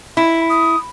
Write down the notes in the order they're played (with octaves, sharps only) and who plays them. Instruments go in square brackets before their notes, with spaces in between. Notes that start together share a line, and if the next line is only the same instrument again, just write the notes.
[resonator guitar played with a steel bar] E4 [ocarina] B5
[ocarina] D#6